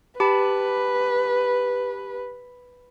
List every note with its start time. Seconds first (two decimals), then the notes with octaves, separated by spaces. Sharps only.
0.20 G4 B4 A5 B5